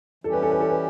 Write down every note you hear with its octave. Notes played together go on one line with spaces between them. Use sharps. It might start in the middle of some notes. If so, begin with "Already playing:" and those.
E3 G3 C#4 G4 A4
B4
A4
B4
A4
B4